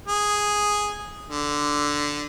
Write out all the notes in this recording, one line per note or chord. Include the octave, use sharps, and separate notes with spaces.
G#4
D3